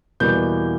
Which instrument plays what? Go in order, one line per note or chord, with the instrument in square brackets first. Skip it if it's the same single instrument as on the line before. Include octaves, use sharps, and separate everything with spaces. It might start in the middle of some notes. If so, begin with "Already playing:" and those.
[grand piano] E2 B2 G3 A#3 G6